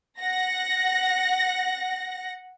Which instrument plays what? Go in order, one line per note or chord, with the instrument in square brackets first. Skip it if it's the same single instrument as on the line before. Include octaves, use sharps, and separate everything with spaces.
[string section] F#5 A#6